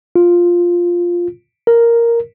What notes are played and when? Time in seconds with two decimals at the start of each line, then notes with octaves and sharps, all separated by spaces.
0.16 F4
1.67 A#4